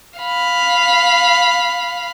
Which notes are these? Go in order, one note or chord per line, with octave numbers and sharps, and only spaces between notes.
F5 B5